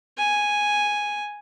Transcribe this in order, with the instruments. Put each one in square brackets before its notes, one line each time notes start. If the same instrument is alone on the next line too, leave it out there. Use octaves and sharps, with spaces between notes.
[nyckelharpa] G#5